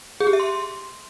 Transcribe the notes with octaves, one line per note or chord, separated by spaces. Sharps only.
G#4
G4
E5
C6